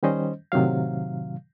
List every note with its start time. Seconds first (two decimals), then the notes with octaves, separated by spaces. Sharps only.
0.03 D#3 G3 C#4 C5 D#5
0.52 A2 C3 D#3 F#3 F5